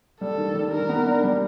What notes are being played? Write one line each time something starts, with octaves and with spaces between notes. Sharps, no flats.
G3 A4
D#3
G3
D#3 A#4
B3
D4
G3